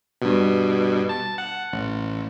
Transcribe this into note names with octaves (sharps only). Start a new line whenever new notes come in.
G2 B2
A5
F#5
A1